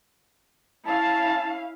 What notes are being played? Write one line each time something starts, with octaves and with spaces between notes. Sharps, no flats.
C#4 E4 F5 A5